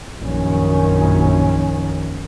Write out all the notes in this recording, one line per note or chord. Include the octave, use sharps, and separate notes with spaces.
A#1 F#2 D#3 C#4